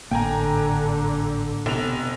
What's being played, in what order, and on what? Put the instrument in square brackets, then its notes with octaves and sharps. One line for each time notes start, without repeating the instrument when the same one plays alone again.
[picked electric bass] G#1 A2 A#3 [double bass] D3 [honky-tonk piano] G5 G#5 A#5
[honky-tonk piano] F1 F7 [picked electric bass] B2